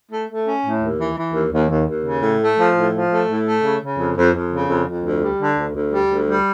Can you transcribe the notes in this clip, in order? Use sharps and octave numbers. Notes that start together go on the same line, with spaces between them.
A3
A3
C#4
A2
D#2
E3
E3
D#2
D#2
D#2
D#2
C#3
A2
A3
F3
A2
F3
A3
A2
A3
C#3
C#3
F2
F2
F2
C#3
F2
F2
D2
G3
D3
D2
D2
G3
D2
G3